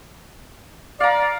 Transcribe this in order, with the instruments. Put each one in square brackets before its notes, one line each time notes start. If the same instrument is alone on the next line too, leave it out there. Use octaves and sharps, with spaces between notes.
[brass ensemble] D5 [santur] F5 A#5